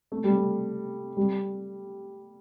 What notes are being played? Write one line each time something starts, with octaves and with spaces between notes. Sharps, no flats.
A3
G3
A3
G3